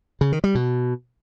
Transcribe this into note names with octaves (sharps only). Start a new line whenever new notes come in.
C#3
D#3
G3
B2